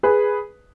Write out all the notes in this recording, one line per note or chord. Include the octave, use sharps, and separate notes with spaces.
G#4 B4